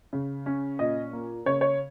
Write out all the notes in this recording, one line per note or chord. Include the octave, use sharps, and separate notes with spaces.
C#3
C#4
A#2 D#5
A#3
C#3 C#5
C#5